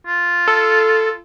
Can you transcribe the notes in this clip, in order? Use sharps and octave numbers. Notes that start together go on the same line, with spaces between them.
F4
A4